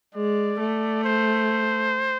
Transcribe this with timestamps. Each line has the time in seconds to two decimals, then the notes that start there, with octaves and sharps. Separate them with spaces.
0.15 G#3 D5
0.60 A3
1.04 C5